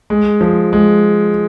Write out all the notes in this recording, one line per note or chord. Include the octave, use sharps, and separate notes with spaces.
G#3
F3
G#3